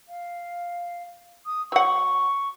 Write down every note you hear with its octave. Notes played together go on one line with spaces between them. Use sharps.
F5
D#6
F#3 F#5 C#6